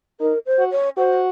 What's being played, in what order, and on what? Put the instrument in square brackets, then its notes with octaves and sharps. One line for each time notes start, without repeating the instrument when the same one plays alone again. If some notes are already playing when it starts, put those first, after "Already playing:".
[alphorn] D#4 [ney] A#4
[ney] C5
[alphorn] F#4
[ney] C#5
[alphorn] F#4 [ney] C5